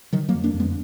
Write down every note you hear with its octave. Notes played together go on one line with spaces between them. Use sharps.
D3 D#3 F#3
F#3 A#3
F2
A#3 D4
F2
G#3 B3